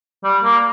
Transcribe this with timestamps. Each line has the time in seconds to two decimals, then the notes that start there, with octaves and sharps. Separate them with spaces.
0.24 G3
0.43 A#3